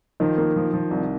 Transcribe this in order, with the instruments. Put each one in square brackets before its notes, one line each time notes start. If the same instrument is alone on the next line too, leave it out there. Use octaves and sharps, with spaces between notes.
[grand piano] D#3 D#4 [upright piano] F3
[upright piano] A#3
F3
F3
C2